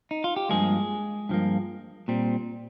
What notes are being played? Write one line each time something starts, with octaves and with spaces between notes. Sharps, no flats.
D#4
F4
G4
G2 F3 G#3 A#3 G#4
G2 F3 A#3
A#2 G3 C4